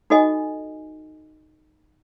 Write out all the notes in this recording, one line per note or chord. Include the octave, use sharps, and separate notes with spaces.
D#4 F#4 A4 D#5 G#5